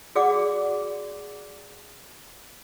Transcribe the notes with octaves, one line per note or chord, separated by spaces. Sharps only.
F#4 G#4 D5 F#5 D6